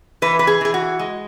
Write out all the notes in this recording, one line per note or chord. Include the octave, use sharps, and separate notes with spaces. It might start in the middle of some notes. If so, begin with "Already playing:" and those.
E3 B4
B4
G#4
E3 G#4
F#4
G#3